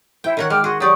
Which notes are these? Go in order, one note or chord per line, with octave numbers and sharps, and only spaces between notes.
E4 C5 G5
D#3 A#4 C#5 F#5
G#3 G5 D6 F6
F#4 G#4 C6
F#3 G4 D5 C#6 D#6